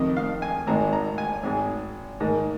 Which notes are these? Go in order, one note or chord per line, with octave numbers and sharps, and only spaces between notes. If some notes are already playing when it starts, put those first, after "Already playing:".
Already playing: F2 C3 D#3 D#5
F5
G#5
G#1 G#2 D#3 G#3 A#5
A#5
G#5
G#1 G#2 G#3
G#2 D#3 A#3